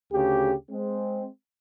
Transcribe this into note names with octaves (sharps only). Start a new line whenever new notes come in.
D2 C#3 G4
G#3 C4